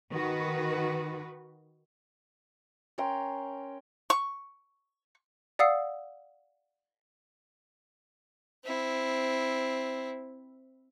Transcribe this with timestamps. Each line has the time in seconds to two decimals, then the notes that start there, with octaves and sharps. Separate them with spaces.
0.11 D#3 F#4 B4
2.98 C#4 A#4 G5 C6
4.10 C#6
5.59 D5 F5 F#5 D#6 E6 C7
8.64 C4 E4